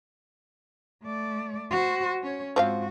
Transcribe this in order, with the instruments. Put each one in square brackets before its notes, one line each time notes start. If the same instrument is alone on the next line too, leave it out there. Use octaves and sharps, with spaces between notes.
[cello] A3 D5
F#4 C5
C#4 C#5
[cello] G#2 F#4 [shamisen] F3 C4 F5